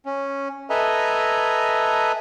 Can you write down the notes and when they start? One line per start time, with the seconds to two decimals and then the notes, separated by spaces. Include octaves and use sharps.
0.06 C#4
0.70 A4 B4 D#5 E5 G#5 A#5